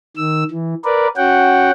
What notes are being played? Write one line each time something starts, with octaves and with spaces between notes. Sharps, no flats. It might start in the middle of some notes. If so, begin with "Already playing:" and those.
D#3 E6
E3
A#4 B4 D5
C#4 F#4 F#5 G5